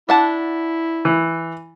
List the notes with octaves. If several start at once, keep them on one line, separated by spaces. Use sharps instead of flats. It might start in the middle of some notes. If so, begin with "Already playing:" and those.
D4 E4 F#5 A5
E3